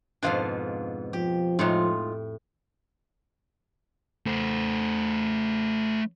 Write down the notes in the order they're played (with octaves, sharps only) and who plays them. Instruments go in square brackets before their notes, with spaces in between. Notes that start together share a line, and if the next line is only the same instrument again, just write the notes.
[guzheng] F2 G#2 B2 [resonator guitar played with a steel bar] D4 F4 F5
[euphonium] F3 [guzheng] G4
[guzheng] A2 [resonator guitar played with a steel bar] G#3 D#4 F4
[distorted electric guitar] A3 C5